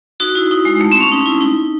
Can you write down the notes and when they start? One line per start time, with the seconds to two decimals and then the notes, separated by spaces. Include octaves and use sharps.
0.20 D#4 F#4
0.35 E4
0.51 D#4
0.65 G#3
0.81 A3
0.92 C4
1.00 C#4
1.12 D#4
1.26 E4
1.41 D#4